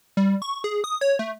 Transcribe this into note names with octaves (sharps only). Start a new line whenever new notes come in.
G3
C#6
G#4
D#6
C#5
A3